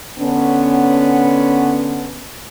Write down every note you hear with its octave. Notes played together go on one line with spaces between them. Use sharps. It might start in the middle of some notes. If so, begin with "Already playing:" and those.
D3 B3 C#4